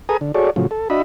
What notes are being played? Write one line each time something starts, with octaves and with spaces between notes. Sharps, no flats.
G#4 A4 B4 G#5 A#5 D#6
D3
F#4 G#4 A4 C#5 D5
A2 C#3 F3 F#3
A4
D4 F#4 D#5 E5 B5